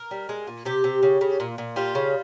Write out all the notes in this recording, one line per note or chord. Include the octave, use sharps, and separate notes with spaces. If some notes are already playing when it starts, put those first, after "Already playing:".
Already playing: A#4
G3
G#3
A#2
C3 G4
C3
C#3
C#3
A#2
A#2
G3 F4
C#3